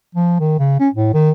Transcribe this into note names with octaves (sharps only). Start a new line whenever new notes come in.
F3
D#3
C#3
C#4
A2
D#3